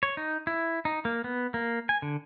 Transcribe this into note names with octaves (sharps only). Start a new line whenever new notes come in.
C#5
D#4
E4
D#4
A#3
B3
A#3
G#5
D3